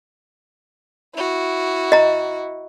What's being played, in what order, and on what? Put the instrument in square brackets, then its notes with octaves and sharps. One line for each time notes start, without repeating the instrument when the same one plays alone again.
[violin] E4 F#4
[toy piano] D#5 A#5